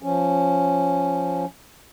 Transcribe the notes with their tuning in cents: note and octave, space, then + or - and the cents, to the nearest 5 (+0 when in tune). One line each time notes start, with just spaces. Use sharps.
F3 +0 C#4 +0